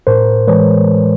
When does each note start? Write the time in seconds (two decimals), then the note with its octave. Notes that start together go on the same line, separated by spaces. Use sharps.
0.07 A2 A#4 C5
0.48 E3 G#3 B4 C#5